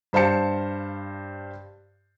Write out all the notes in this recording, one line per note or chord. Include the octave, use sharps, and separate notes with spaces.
G2 C5 F5 A5 C#7